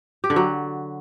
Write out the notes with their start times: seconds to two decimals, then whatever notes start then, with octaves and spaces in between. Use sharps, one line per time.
0.24 G4
0.30 D3
0.36 F#3